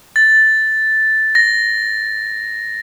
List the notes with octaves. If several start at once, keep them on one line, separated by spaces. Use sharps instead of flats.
A6
A#6